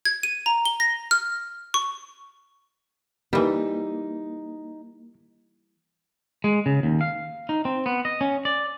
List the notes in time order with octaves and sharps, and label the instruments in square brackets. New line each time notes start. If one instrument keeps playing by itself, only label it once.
[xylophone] G#6
D#7
A#5
G7
A#6
F6
C#6
[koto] E3 G3 [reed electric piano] A#3 [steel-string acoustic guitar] D#4
[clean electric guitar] G#3
C#3
D#2
F5
D#4
C4
B3
D#5
C#4
D5